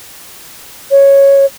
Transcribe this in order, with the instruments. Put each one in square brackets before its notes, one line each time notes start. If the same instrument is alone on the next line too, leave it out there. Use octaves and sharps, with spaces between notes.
[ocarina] C#5